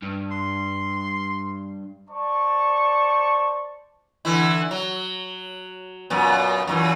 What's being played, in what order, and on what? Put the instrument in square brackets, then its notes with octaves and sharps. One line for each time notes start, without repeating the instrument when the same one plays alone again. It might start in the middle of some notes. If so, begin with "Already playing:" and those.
[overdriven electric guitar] G2
[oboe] C6
[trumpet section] C5 D5 A5 C#6
[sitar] D3 E3 E4
F#3
F#2 A#2 B3
F#2 A#2 E3